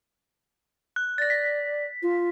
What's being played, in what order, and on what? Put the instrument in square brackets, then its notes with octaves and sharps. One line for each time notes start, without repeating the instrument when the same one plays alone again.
[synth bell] F#6
[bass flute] D5 [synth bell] A6 A#6
[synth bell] B6
[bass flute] F4